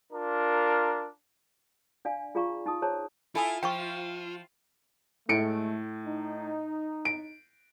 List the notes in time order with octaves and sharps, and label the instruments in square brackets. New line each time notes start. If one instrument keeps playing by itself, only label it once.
[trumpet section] D4 F4 A#4
[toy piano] D4 D5 F5 G#5
F4 G#4 D5 F5 A#5 C#6
D#4 A5 D#6
G#4 C5 C#5 A5 A#5
[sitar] E4 [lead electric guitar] F4 [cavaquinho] A4 G#5 D#6
[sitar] F3 [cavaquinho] C5 E5 F5 [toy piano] G5 C#6
[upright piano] A2 C#7 D7 [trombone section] G#3 A3
[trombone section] D#4
[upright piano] D7